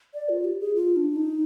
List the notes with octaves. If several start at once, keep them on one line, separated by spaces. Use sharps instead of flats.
D5
F4
G4
G#4
F4
D4
D#4